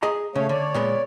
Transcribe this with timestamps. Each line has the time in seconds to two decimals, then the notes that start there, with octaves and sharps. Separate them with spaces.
0.02 G#4 D#5 A#5
0.36 C#3 A3 C#5 F5
0.49 D3 C#5 D5
0.74 A#2 G#3 B3